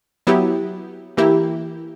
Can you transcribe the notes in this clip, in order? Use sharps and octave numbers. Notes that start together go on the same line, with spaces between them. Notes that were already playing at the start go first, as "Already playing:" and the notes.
F#3 B3 E4 G4
E3 A#3 E4 G4